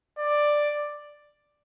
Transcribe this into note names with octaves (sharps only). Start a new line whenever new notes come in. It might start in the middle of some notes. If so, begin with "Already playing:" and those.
D5